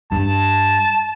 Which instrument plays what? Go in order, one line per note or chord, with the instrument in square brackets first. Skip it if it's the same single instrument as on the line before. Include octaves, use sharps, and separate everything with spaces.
[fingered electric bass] G2 [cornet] A5